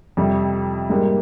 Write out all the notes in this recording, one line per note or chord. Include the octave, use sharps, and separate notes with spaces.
F2 C3 G3
G#2 G3 A#3